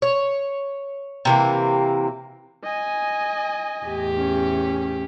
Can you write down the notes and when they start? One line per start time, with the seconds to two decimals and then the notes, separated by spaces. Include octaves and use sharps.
0.02 C#5
1.25 C3 E3 A#3
2.64 D#5 G#5
3.86 E2 A2 G4
4.16 C#4